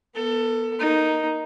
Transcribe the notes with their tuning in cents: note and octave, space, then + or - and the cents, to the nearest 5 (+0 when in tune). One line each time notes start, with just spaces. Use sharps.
B3 -25 A4 +25
A#3 +15 D#4 +0